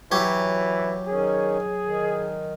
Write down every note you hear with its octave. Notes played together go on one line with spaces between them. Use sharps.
E3 F#3 G4 C#5
D#3 C#4 G#4
D#3